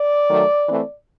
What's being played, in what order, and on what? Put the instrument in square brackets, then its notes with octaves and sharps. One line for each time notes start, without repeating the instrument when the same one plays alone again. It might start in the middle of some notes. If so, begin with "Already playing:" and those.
Already playing: [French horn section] D5
D#3 F#3 A3
E3 A3 C4